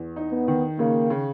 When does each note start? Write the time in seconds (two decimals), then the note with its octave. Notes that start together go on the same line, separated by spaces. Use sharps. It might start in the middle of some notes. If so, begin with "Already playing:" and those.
Already playing: E2
0.16 D#4
0.32 B3
0.48 D#3
0.79 C#3 A#3
1.10 C#3